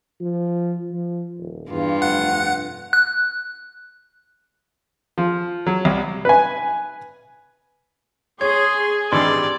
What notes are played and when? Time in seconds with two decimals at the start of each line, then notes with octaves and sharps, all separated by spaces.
0.21 F3
0.92 F3
1.39 D#1
1.71 E2 G2 F4
2.02 F1 F#5
2.93 F#6
5.18 F3
5.67 F#3
5.85 C2
6.25 B4 G#5
8.41 G#4 C#5 C6 G#6
9.12 G#1 G2 E3 G4 D5 C6